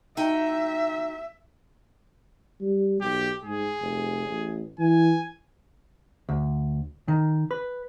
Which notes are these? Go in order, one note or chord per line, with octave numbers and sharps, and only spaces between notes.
D#4 F#4 E5 G5
G3
B1 G4
G#2 G#4
F1
A1
E3 G#5
D2
D#3
B4